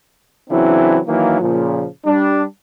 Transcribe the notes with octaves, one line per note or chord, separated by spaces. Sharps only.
C#3 E3 F#3 C4 D4 E4
D#3 E3 F#3 A#3
A#2 C#3 F3
G3 D4